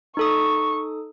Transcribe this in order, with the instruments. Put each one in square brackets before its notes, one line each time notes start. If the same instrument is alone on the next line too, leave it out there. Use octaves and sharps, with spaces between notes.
[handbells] D#4 A4 D#6 [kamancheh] C#6